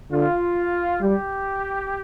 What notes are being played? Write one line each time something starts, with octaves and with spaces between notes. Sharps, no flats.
D3 F4
G3 G4